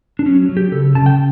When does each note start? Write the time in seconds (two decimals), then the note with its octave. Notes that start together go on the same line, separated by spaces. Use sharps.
0.19 D4
0.26 F#3 C#4
0.49 F#3
0.57 G4
0.72 C#3 A4
0.95 C#3 A5
1.06 G5